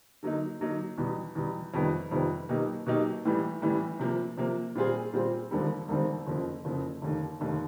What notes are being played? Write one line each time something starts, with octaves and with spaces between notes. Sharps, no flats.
D3 F#3 A#3 D#4
D3 F#3 A#3 D#4
E2 B2 G3
E2 B2 G3
F2 C3 D#3 G3 B3
F2 C3 D#3 G3 B3
B2 F#3 A#3 D#4 G4
B2 F#3 A#3 D#4 G4
A2 E3 G3
A2 E3 G3
C3 F3 A#3
C3 F3 A#3
A#2 G3 C4 F4 G#4
A#2 G3 C4 F4 G#4
E1 D#2 D3 G3 C4
E1 D#2 D3 G3 C4
F#1 F2 C#3
F#1 F2 C#3
F1 D#2 D3
F1 D#2 D3